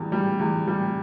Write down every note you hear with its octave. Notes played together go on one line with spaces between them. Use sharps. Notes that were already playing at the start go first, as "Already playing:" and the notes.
Already playing: E2 G3
G3
E2
G3